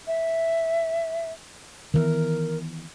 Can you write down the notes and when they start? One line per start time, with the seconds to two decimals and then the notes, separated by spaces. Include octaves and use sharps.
0.07 E5
1.94 D#3 E3 B3 A#4